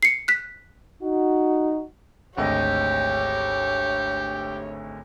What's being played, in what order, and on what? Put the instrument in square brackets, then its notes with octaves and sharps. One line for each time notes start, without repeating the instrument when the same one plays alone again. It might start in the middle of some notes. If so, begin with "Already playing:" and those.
[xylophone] C7 C#7
F#6 B6
[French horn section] D#4 F#4
[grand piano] G#1 D2 D#5 [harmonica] G4 [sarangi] C#5